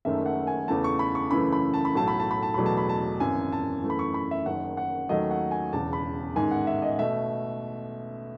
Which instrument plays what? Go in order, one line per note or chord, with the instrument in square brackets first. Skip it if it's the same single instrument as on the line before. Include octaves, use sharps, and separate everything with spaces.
[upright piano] F#1 F#2 D#3 A3 E5
F#5
G#5
E2 C#3 E3 A3 A5
C#6
B5
C#6
F#2 C#3 E3 A3 B5
B5
A5
B5
B1 A2 F#3 A3 A5
B5
A5
B5
A5
E1 E2 B2 F#3 A3 B5
A5
B5
A5
G#1 F#2 E3 G#5
A5
F#2 E3 A3
B5
C#6
B5
E5
F#1 F#2 D#3 F#5
F#5
D#2 D#3 F#3 A3 D#5
F#5
G#5
E1 E2 C#3 A5
B5
A1 G#2 D#3 G#5
F#5
E5
D#5
B2 A3 E5